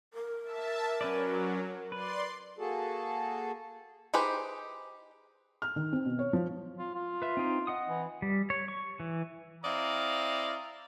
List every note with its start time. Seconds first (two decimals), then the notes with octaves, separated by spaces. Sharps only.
0.14 A#4
0.43 E5 A5
1.01 F#3 C#4 B4 D5
1.92 B4 D5 C6
2.58 A#3 F#4 G#4 A4 A5
4.14 D#4 G4 G#4 B4 C5
5.62 F6
5.76 D#3
5.93 C4
6.06 B2
6.19 C#5
6.33 F3
6.78 F4
6.95 F4
7.22 B4 E5
7.37 C4 D#4
7.67 D#5 F#5 D#6
7.89 E3
8.22 G3
8.50 C#5
8.68 C#6
9.00 E3
9.63 C4 E4 D5 D#5 F5 A#5